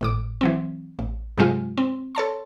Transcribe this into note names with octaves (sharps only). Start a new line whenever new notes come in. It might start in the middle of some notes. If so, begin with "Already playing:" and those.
G#1 A2 D6
E3 F#3 C4
A1
G2 C3 F#3 G#3 F4 G4
C4
A4 C#5 A5 C6